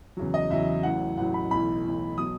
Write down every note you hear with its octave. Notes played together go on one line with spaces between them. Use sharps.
E2 C#3 F#3
D#5
E2 C#3 F#3 E5
A1 A2 F#3 F#5
A1 A2 F#3 F#5
B5
B1 A2 E3 B5
B1 A2 E3
B2 F#3 D#6